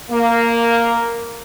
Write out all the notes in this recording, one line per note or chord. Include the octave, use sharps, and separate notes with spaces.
A#3